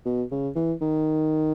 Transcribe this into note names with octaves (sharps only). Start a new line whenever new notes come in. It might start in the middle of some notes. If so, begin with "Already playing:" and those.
B2
C#3
E3
D#3